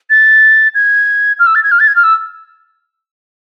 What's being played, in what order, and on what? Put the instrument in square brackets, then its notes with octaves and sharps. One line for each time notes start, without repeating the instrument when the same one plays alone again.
[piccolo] A6
G#6
F6
E6
A6
G#6
F6
A6
G#6
F6
E6